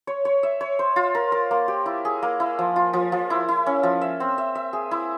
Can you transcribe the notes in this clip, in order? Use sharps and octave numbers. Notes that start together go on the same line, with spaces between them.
C#5
C#5
E5
C#5
C5
F4
A#4
A#4
A#3
G4
E4
G#4
A#3
E4
F3
F4
F3
F3
E4
E4
C#4
F3
E5
C4
E5
E5
G#4
E4